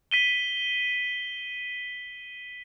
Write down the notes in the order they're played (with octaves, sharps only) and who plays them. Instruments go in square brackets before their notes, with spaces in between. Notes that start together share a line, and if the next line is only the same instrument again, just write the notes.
[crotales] B6 D#7 G7